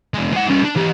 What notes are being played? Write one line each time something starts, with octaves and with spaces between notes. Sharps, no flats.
E2 G#3
G#3 F#5
G3 C#4
D4
E3 G4